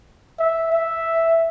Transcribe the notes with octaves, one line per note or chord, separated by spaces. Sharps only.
E5
E5